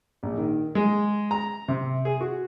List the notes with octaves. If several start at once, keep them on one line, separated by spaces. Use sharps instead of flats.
A#1
D#3
G#3
A#5
C3
G#4
F#4